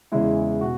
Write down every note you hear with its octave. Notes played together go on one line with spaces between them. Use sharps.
E2 C#3 E3 G#3 E4
B2 F#4